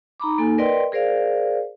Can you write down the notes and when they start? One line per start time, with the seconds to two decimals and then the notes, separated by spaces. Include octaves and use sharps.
0.20 D#4 A#5 B5 D6
0.38 A#3 D#4 A4 G#5
0.58 A#4 B4 D5 D#5 G5 C6
0.92 G#4 A#4 C5 D5 F5